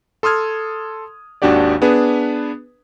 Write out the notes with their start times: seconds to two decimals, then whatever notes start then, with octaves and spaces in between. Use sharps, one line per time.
0.23 A4 C6 D#6 F6 G#6
1.42 G#1 D#2 D4 F#4 G4 D5
1.82 B3 D4 G#4 B4